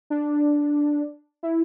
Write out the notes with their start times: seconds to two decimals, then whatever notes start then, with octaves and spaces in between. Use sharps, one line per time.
0.10 D4
1.43 E4